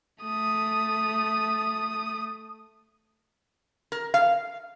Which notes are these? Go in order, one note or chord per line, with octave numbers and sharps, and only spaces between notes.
A3 D#6
A#4
F5